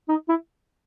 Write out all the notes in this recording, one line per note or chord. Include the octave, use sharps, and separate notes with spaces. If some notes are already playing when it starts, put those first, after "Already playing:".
D#4
E4